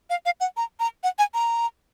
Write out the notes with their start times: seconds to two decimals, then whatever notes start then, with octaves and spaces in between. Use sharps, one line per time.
0.10 F5
0.26 F5
0.40 F#5
0.57 A#5
0.80 A#5
1.03 F#5
1.19 G#5
1.34 A#5